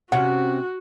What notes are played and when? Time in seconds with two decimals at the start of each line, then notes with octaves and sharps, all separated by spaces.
0.12 C3 C#4 F#4 F#5